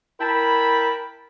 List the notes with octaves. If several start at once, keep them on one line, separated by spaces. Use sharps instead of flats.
E4 A#4 G5 A5 B5